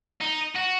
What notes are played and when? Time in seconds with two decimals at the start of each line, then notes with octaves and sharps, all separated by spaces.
0.21 D#4
0.55 F#4